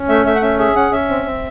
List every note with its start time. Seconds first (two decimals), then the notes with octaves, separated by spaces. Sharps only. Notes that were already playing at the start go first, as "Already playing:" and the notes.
Already playing: C#4
0.09 A3 E5
0.26 A3 E5
0.35 F#5
0.42 C#4 E5
0.59 G#4 E5
0.76 C#4 F#5
0.91 C#4 E5
1.09 C4
1.26 C4